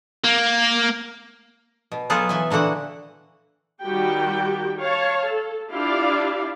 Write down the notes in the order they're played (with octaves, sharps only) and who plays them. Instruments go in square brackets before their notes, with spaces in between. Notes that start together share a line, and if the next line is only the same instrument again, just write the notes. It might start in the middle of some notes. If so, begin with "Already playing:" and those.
[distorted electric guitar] A#3
[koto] B2
F#3 B3 F4 G#4 A4
E3 E5 G#5
A#2 D3 E3 F#4 F#5
[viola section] D#3 G3 F#4 G4 G5
C#5 F5 A5
A4
D4 E4 F4 G4 D5 F5